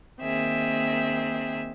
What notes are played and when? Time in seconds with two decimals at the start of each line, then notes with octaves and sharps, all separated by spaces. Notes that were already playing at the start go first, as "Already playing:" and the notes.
0.21 D#3 A#3 C4 G#4 E5